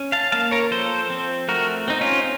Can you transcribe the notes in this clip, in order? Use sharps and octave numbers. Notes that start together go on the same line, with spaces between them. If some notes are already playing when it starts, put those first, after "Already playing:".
Already playing: C#4
F5 A5
A#3 F5 A5
A#4 C#5
F3 A4 C5
C4
A3 F#4 A#4
C4 D#4
C#4 F4